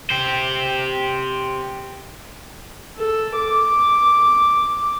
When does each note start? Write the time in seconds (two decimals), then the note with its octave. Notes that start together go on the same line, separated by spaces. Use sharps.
0.10 G4 C5
2.98 A4
3.36 D6